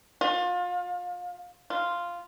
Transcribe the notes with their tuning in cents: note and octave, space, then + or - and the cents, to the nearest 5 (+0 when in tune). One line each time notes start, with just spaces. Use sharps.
F4 +30
F4 -5